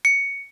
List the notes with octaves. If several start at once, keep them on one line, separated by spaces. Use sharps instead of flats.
C#7